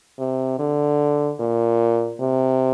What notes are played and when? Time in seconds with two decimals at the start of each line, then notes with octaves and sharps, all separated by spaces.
0.19 C3
0.59 D3
1.40 A#2
2.20 C3